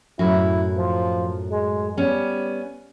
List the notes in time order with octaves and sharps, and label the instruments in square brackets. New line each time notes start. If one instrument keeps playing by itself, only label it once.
[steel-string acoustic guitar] F#2 A2 F#4 [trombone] E4
[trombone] F3
G#3
[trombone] G3 [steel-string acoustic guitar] B3 C#4